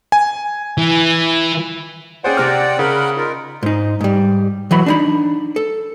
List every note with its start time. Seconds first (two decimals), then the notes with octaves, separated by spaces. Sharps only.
0.12 G#5
0.78 E3
2.24 C#4 G#4 C5 D5 F#5 G5
2.37 C3 C4 F6
2.79 C#3 A#4 F#5 B5
3.17 D#4 F4 A#4
3.63 G#2 D#4
4.01 G#2 G3
4.71 E3 F#3 B5
4.86 D4 D#4 B5
5.56 A4